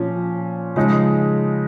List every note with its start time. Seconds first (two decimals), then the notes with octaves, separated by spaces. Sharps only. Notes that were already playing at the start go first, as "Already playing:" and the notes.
Already playing: A#2 F3 C#4
0.76 C#3 F3 G#3 D#4